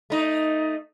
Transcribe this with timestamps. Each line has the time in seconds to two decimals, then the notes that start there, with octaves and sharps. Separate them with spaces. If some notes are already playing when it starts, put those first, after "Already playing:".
0.10 A3 D#4